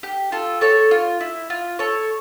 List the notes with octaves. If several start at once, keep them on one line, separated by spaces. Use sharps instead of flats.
G4
F4 A4
A4 C#5
F4
E4
F4
A4 C#5